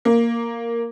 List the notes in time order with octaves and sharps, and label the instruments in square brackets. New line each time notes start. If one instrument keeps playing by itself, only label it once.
[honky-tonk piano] A#3